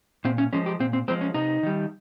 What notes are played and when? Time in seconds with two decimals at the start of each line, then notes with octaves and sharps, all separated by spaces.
0.25 A#2 C4
0.38 C#4
0.53 F3 G#3 C#4
0.66 G4
0.80 A#2 C4
0.93 C4
1.08 F3 G#3 C4
1.21 C#4
1.34 C3 D#4
1.63 D#3 G3